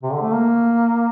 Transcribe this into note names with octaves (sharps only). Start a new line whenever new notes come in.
C3
D3
A3
A#3